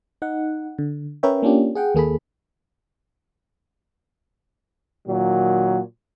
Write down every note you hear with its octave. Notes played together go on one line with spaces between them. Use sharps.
D#4 F#5
D3
C#4 A#4 B4 C#5 E5 G5
A#3 C#4 D4 F4 G4
G#4 F#5 G5
D#2 A#3 G#4 A4 B5
A#2 D#3 F#3